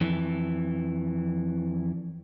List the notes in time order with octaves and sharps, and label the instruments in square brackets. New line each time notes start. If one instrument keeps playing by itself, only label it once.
[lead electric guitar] F2 E3